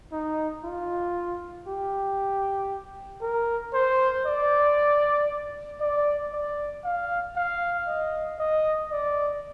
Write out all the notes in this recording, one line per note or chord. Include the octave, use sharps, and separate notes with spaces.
D#4
F4
G4
A#4
C5
D5
D5
D5
F5
F5
D#5
D#5
D5